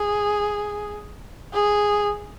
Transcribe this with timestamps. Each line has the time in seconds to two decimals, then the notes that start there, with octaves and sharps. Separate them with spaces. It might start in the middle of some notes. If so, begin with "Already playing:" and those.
Already playing: G#4
1.53 G#4